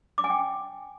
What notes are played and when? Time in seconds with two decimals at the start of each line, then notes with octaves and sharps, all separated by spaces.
0.18 D6
0.24 G#5
0.30 G5